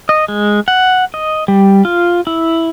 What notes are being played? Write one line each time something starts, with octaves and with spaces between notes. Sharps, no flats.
D#5
G#3
F#5
D#5
G3
F4
E4